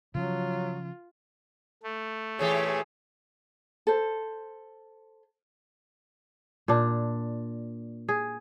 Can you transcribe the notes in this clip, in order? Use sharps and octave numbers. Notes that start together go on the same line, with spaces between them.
C#3 F3 F#3 C#4 F4
A3
A#2 E3 G4 G#4 C#5
A4 C5
A#2 D4
G#4